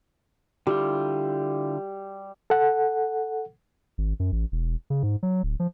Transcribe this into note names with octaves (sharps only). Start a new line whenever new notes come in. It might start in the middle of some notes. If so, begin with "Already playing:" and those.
D3 G3 E4 F4 G4
A4 F#5
G#1
F#2
A1
E1
C#3
G#2
F#3
D1
F3